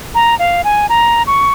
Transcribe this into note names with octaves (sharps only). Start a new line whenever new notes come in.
A#5
F5
G#5
A#5
C#6